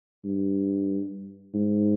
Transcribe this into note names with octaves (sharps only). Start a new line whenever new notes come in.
G2
G#2